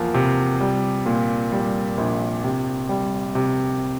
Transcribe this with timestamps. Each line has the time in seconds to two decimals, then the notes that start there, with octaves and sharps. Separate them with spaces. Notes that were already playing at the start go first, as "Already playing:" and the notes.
Already playing: E2 F3 A#3
0.14 C3
0.61 G3
1.06 A#2
1.52 G3
1.98 A#1
2.44 C3
2.89 G3
3.35 C3